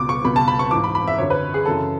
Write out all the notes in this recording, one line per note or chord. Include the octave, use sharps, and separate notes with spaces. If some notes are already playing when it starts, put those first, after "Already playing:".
Already playing: C#2 B2 D6
C#6
C#2 B2 B5
A5
B5
C#6
G#2 E3 D6
B5
B5
E5
F#2 D3 C#5
B4
G#4
F#2 C#3 E3 A4